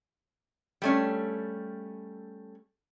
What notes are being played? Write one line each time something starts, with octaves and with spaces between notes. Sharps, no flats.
G3 A3 C#4